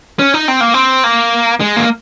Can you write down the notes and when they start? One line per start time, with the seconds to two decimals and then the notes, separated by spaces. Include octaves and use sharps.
0.19 C#4
0.34 D#4
0.48 C4
0.61 A#3
0.74 C4
1.04 A#3
1.60 G#3
1.76 A#3